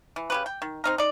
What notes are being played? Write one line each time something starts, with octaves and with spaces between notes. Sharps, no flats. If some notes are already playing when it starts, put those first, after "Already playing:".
E3
C#3 G4 B4
G5
D#3
C4 D#4 A#4
D#4 D5